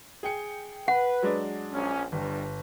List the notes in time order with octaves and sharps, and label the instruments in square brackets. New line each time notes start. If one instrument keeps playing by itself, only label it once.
[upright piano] G#4 G5 C#7
[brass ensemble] B4 [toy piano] F#5
[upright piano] F#3 G#3 D4
[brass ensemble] A#1 C#4
[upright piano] G1 [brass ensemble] G2